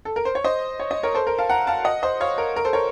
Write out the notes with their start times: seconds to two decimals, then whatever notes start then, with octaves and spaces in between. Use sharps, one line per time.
0.05 A4
0.16 A#4
0.25 C5
0.35 C#5
0.44 C5 D#5
0.80 C#5
0.91 D#5
1.03 A#4 C#5
1.15 A4 C5
1.27 A#4
1.38 F5 A5
1.50 F#5 A#5
1.67 F5 A5
1.85 D#5 F#5
2.03 C5 D#5
2.21 C#5 F5
2.38 A#4
2.56 A#4
2.65 A4 C5
2.73 A#4 C#5